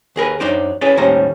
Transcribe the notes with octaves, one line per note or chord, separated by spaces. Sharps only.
D#2 G#4 A#4 B4
F#2 F#3 D4 D#4 C5 D5
C#4 E4 G#4 B4 C#5 D5
D#2 A2 G3 C#4 C5 A#5